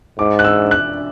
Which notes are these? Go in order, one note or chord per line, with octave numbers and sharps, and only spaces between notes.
G#2 D6
F#6
E6
F#6